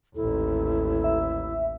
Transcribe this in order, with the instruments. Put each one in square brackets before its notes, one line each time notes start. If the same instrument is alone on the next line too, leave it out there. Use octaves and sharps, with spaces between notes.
[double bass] A1 D#2 [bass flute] E4 [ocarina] A4
[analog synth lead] E5